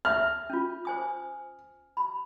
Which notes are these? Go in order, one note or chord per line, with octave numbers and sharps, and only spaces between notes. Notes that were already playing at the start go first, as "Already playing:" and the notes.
E5 F6
C#4 F4
C5 G#5 D#6
B5